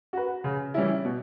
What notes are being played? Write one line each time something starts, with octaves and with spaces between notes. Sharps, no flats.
F#4 B4
C#3
E3 G3 C#4 E4
B2